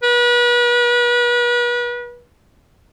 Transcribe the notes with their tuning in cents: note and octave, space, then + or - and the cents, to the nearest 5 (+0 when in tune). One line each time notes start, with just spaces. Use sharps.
B4 -35